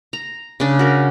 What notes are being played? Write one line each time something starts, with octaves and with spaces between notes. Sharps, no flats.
A#5
C#3 D4
F#4 A#4